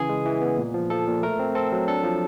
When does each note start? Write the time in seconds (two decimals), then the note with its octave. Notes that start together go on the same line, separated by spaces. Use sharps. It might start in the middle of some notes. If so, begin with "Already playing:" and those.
Already playing: C#3 E3 G#4
0.09 G#3
0.26 E3
0.42 B3
0.58 A#2
0.74 F3
0.90 F3 A4
1.07 A#2
1.23 A3 A#4
1.39 C4
1.55 C4 A4
1.72 F#3
1.88 D4 A4
2.04 F3